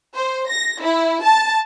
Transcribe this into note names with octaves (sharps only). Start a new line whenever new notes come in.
C5
A#6
E4
A5